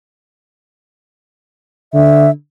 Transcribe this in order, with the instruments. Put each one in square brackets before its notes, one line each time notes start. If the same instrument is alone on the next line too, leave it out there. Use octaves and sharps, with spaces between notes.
[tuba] D3 [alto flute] E5